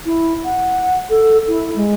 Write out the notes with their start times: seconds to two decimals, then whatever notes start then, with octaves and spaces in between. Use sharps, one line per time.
0.06 E4
0.44 F#5
1.10 A4
1.48 E4
1.76 G#3